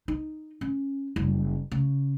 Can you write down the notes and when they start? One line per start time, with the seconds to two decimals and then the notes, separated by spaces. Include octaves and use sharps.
0.08 D#4
0.61 C#4
1.16 F#1 G3
1.71 C#3